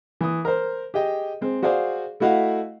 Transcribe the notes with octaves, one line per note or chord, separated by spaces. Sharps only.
E3 D#6
A#4 C5
G4 G#4 D#5 G5
G#3 C4
F#4 G#4 C5 D5 F5
A3 E4 F#4 D#5 F5 F#5